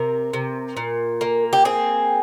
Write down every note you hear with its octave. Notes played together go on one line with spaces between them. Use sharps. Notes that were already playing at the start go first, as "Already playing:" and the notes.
Already playing: C3 A#4
C3
A#2
A#3
G4
C4 G#4